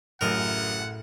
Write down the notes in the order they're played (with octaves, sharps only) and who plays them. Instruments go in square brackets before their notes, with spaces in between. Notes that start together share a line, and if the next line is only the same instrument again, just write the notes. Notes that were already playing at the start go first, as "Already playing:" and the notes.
[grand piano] A1 F#2 C#3 [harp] A2 [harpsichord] A#4 D#5 [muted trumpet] F#5